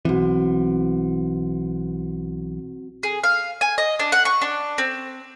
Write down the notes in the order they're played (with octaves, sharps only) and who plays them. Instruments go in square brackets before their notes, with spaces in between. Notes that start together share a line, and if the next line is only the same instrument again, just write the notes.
[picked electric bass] B1 E3 [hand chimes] C4 F#4
[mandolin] G#4
F5
G#5
D#5
D4
F#5
C#6
D4
C4